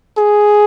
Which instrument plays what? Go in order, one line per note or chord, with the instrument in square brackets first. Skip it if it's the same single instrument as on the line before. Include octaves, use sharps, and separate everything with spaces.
[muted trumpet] G#4